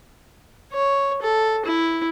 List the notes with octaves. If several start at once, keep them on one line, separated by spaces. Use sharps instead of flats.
C#5
A4
E4